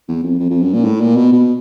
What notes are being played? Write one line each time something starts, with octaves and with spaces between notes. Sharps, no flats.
E2
F2
F2
F2
F#2
A#2
G#2
A2
A#2
B2
B2